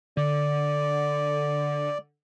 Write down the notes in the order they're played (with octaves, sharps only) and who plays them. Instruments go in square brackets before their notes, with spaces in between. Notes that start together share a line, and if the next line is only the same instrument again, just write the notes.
[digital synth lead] D3 [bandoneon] D5